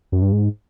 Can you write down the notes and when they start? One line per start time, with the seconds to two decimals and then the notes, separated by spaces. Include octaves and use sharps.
0.12 F#2
0.22 G2
0.32 G#2